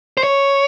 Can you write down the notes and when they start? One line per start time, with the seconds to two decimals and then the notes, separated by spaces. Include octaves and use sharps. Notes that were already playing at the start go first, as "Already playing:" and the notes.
0.17 C5
0.23 C#5